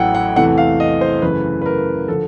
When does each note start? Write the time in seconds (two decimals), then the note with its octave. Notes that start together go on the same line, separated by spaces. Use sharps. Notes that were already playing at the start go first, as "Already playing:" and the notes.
Already playing: A1 A2 F#3 A3 F#5 G5
0.15 F#5
0.36 E2 C3 E3 A3 F#5
0.58 F5
0.80 D#5
1.01 C5
1.22 F#2 C#3 E3 A3 B4
1.62 B4
1.66 A#4
2.08 D3 F3 A4